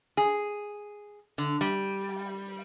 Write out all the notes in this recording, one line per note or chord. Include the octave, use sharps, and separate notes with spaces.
G#4
D3
G3